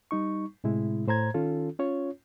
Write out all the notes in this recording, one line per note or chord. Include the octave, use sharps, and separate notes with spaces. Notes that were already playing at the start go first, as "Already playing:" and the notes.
G3 D#4 C#6
A2 C3 G#3 E4
A2 C5 A#5 G#6
D#3 C#4 F4 A4
C#4 F4 C#5